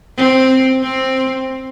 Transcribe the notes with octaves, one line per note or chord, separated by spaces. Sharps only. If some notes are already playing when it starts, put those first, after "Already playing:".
C4
C4